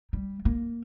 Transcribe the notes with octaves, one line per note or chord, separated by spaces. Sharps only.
G3
A#3